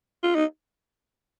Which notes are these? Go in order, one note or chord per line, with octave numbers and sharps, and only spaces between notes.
F4
D#4